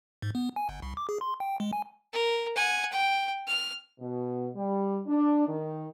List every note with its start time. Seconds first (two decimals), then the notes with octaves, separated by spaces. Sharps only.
0.22 G#2
0.35 B3
0.56 G#5
0.69 G1
0.82 C2
0.97 D6
1.09 G#4
1.21 C6
1.40 G5
1.60 G#3
1.73 G#5
2.13 A#4
2.56 F#5 G#5
2.92 G5
3.48 F6
4.00 B2
4.55 G3
5.06 D4
5.48 D#3